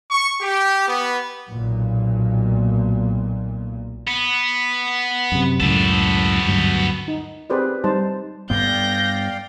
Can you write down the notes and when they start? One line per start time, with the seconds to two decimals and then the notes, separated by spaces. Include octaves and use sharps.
0.11 C#6
0.42 G4
0.89 B3
1.49 B1 A#2
4.07 B3
5.32 F#2 C3
5.61 C#2 F#2 A2 B3 A4
6.47 D2 G2 F#3
7.08 D#4
7.50 C4 G4 G#4 B4 C5 D5
7.84 G3 D#4 C5 A5
8.50 G2 B3 D5 F5 G5 G6 A#6